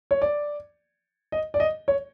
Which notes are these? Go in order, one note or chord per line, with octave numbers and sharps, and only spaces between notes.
C#5
D5
D#5
D5
D#5
C#5